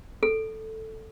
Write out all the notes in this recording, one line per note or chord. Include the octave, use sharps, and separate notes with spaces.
A4